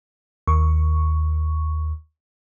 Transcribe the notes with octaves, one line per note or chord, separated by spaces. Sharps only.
D#2 C#6